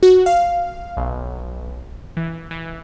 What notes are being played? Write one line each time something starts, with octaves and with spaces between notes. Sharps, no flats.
F#4
F5
B1
E3
E3